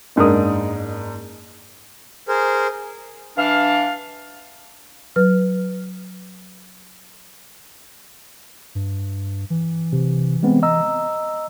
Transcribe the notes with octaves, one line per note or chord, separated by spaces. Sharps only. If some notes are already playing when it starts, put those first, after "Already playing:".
F#1 G#2 D4 A#4 D#6
G#4 A#4 C5
E3 D4 F5
F#3 B4 F6
G2
E3
C3
G#3 B3 C4
D#5 A#5 E6